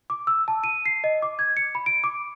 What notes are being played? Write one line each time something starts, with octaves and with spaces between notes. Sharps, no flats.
D6
E6
A5
D#7
C7
D#5
D6
G#6
C#7
B5
D7
D6